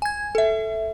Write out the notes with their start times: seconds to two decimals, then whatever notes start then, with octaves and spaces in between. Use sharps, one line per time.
0.02 G#5 G#6
0.35 A4 E5